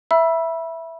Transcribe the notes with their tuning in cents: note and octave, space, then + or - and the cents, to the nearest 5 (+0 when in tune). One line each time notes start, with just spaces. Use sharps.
E5 +0 B5 -25 E6 +10